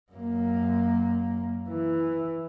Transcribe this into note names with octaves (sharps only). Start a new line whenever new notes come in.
F#2 A#3
E3